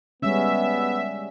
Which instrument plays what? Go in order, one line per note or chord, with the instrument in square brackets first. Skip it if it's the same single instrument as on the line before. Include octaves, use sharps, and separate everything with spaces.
[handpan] G3 G#3 C#4 [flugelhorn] B3 [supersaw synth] E5